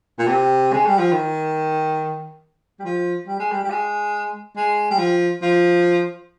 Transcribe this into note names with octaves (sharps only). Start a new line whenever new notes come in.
A#2
C3
G#3
G3
F3
D#3
G3
F3
G3
G#3
G3
G3
G#3
G#3
G3
F3
F3